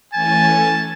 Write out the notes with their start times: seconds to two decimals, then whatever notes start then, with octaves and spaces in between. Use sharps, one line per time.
0.14 E3 A3 C#4 G#5 A5